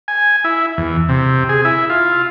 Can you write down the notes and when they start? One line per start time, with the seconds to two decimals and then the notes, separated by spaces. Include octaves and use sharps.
0.08 G#5
0.44 E4
0.78 E2
1.09 C3
1.49 G#4
1.65 E4
1.90 F4